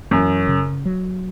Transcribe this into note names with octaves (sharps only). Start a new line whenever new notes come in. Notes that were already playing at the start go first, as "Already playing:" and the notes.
F#2 E3
C#3
F#3